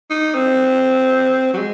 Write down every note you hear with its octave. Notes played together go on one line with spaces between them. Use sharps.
D#4
C4
F#3
G#3